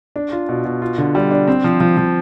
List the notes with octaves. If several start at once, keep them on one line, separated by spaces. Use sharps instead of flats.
D4
F4
B2
B2
F4
D3
G3
D4
C4
F3
F3
F3